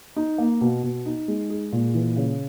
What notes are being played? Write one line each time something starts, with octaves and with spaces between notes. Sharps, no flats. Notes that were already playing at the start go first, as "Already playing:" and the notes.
D#4
A#3
B2
B2
D#4
G#3
G#4
A#2
E3
C#3